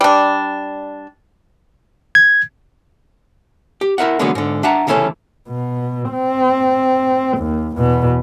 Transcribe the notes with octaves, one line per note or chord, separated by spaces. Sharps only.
G3 D4
G#6
G4
E4 A#4 E5 F#5
D3 E3 F#3 G#3 A#3 B3
G#2 D3
D4 E5 F#5 A5 A#5
C2 C#3 E3 A3 C#4 A4
B2
C4
D#2
E2 B2